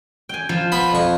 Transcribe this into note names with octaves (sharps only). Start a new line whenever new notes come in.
G5 G#5
F3 F4
B3 B4 B5
F2 C#6